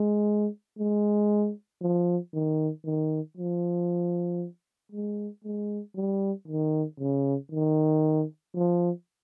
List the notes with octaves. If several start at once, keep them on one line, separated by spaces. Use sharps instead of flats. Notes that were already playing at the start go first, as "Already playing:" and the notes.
Already playing: G#3
G#3
F3
D#3
D#3
F3
G#3
G#3
G3
D#3
C#3
D#3
F3